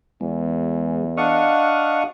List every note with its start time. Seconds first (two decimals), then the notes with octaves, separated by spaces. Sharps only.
0.21 E2 G#3
1.17 D4 D#5 F5 F#5 C#6